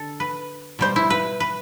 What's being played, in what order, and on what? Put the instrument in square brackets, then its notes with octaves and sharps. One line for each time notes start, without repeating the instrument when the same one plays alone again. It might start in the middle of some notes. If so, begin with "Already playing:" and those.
Already playing: [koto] D3 A4
B4
B2 G3 C5
E4
B4
B4